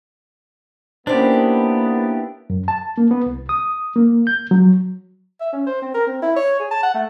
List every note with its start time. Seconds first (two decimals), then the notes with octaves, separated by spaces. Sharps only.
1.07 A#3 B3 C#4 D4 E4 G4 C5
2.50 F#2
2.68 A5
2.98 A#3
3.11 B3
3.26 C2
3.49 D#6
3.96 A#3
4.27 G6
4.51 F#3
5.41 E5
5.53 C#4
5.67 C5
5.82 C4
5.94 A#4
6.07 C4
6.22 E4
6.36 C#5
6.59 G#4
6.71 A5
6.83 F#5
6.94 A3